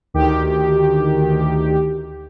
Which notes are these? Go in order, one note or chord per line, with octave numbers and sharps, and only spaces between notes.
D2 D#3 G4